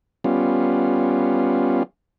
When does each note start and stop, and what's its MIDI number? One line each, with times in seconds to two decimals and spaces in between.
0.24 1.83 55
0.24 1.83 59
0.24 1.83 61
0.24 1.83 65